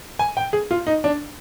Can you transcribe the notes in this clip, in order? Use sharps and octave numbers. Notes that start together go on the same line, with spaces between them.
G#5
G5
G#4
F4
D#4
D4